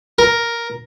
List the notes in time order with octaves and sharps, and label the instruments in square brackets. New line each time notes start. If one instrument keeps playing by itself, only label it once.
[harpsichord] A#4